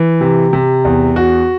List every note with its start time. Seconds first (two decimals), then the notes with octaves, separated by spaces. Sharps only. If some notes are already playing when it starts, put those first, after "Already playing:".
Already playing: E3
0.21 C3
0.53 C3
0.85 E2
1.16 F#4